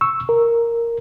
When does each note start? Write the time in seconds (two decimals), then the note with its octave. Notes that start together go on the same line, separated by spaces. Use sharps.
0.01 C#6 E6
0.29 A#4